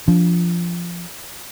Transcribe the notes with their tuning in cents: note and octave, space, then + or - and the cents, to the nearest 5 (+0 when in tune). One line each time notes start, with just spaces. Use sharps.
F3 -10 D4 -25